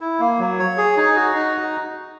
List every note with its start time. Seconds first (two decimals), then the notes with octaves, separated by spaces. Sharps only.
0.01 E4
0.20 A#3
0.39 F#3
0.59 C#5
0.77 G#4
0.97 D#4
1.16 F#4
1.35 D#4